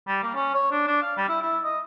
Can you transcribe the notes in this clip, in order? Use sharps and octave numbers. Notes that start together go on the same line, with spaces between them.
G3
A#3
C#4
C#5
D4
D4
F5
G3
E4
E4
D#5